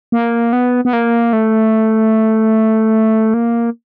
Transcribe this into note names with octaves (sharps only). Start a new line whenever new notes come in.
A#3
B3
B3
A#3
A3
A#3